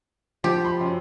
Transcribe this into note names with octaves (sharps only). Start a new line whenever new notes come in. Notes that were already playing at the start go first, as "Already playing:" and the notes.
F3 G4
B5 C6
F#2